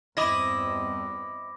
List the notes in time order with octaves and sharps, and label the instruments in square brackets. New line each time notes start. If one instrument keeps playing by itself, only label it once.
[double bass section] E2 G2 C4 [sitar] E4 D#5 [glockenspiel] B5 D6 A#6